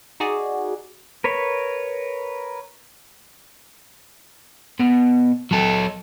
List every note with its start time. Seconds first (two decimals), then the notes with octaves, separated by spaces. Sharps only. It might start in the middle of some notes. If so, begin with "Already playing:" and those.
0.20 D#4 F#4 G#4 D5
1.24 A#4 B4 C#5
4.79 B2
5.51 F#3 A4